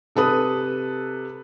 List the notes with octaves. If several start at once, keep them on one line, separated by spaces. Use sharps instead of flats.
C3 A4 B4 D#6